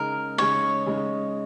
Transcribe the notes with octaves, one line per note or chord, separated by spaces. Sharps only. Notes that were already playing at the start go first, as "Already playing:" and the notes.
Already playing: C#3 G#3 D#4 A#4
C#3 G#3 D#4 C#5
C#3 G#3 D#4